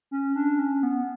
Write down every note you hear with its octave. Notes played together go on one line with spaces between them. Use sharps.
C#4
D4
C#4
B3